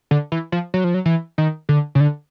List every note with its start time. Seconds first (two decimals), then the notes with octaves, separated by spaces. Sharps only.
0.11 D3
0.32 E3
0.52 F3
0.74 F#3
0.84 F3
0.94 F#3
1.05 E3
1.38 D#3
1.69 D3
1.95 C#3
2.00 D3